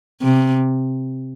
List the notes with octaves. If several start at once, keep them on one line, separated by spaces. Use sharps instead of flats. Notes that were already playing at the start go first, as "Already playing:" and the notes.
C3